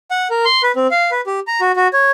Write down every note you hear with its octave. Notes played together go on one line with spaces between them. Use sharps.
F#5
A#4
C6
B4
C4
F5
B4
G4
A#5
F#4
F#4
C#5